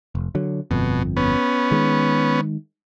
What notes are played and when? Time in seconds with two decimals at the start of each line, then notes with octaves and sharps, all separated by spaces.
0.15 F1
0.35 D3 F#3
0.71 G1 F2 B2
1.17 B3 C#4
1.71 D#3 G#3